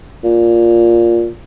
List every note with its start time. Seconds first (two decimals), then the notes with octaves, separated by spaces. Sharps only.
0.24 A#2